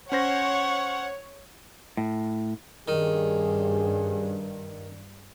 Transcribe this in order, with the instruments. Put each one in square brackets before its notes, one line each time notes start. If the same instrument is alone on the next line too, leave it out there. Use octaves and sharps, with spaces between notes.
[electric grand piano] C#4 C5 A#6 [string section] C#5 [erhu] F#5
[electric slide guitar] A2
[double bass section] G2 [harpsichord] D#3 [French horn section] C#4 G4 G#4